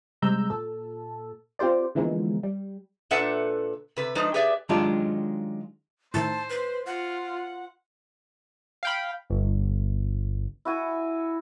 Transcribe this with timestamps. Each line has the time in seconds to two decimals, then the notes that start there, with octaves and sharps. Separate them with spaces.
0.22 C3 G3 G#3 A#5 E6 G6
0.50 A#2 A4
1.59 C4 F4 G4 C5 D5
1.95 D3 E3 F3 G#3 A#3 B3
2.43 G3
3.11 A#2 D4 A4 B4 E5 F#5
3.96 C3 B4
4.15 F3 G#3 D4 D#4 B4
4.34 G4 G#4 B4 D5 E5
4.69 D#3 F#3 G#3 D4 F4 G4
6.14 A2 D#3 C5 A5
6.50 B4
6.86 F4 F#5
8.83 F5 G5 B5
9.30 G1
10.65 E4 F#4 G#5